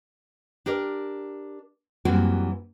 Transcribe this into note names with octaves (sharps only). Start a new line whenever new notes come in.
D4 G4 A#4 D5
F#2 E3 G3 A#3 C4 F#4